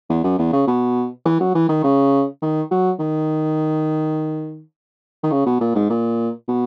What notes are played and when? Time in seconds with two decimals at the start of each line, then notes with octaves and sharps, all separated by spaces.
0.10 E2
0.24 F#2
0.39 E2
0.53 C#3
0.67 B2
1.26 E3
1.40 F#3
1.55 E3
1.69 D#3
1.84 C#3
2.42 D#3
2.71 F#3
2.99 D#3
5.23 D#3
5.32 C#3
5.46 B2
5.60 A#2
5.75 G#2
5.90 A#2
6.48 B2